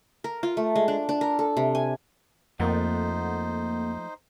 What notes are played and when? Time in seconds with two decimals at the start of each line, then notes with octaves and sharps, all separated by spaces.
0.24 A#4
0.43 F4
0.57 A3
0.76 G#3
0.88 D4
1.09 D4
1.21 A#4
1.39 A4
1.57 C3
1.75 G#5
2.60 F2 F3 A3 A#3 D#4 C5 F#5